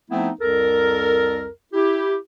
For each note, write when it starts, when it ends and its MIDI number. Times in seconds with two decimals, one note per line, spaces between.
0.11 0.30 53
0.11 0.30 57
0.11 0.30 59
0.11 0.30 60
0.11 0.30 63
0.11 0.30 64
0.40 1.47 36
0.40 1.47 41
0.40 1.47 69
0.40 1.47 70
1.73 2.16 64
1.73 2.16 67